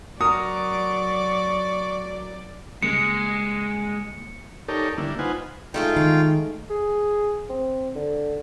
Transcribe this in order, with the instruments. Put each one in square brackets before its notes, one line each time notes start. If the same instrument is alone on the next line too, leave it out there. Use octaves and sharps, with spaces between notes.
[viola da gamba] F#3 D5 [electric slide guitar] F#4 A#4 [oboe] C#6 [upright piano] D#6
[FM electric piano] C#3 G3 A#3 [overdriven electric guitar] G#3 [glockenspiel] C#7
[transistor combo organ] D#4 G4 A4 A#4 C#5 D5
D3 G3 A#3 D4 E4
D#4 F4 B4 C5 F#5 G#5
[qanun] G#3 A3 D#4 [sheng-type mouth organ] F4 G5
[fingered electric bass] D#3 [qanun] F5
[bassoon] G#4
C4
D3